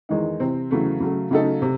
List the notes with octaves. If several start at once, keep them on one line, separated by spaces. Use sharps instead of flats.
E2 D#3 G#3 D#4
C3 E3 C4
E2 C#3 F#3 A3
C#3 F#3 A3
C#3 F#3 A3 D#4 A4
C3